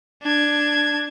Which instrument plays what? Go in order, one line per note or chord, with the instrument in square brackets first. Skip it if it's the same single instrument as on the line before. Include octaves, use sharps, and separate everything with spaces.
[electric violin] D4 G#6